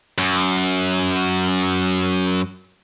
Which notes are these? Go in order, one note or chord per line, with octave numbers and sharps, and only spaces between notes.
F#2